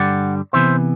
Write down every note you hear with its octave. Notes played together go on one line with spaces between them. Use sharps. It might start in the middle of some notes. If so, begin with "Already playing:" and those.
Already playing: G2 D3 G3 D5 F#5
C3 E3 B3 C5 E5